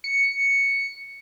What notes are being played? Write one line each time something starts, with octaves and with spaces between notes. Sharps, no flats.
C#7